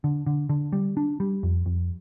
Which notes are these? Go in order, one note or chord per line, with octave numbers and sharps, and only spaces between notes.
D3
D3
D3
G3
D4
G3
F2
F2